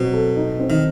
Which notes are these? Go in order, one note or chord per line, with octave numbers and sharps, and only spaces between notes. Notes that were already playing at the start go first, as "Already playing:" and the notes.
Already playing: B2 F#3 C4
A4
D#4
C4
D#3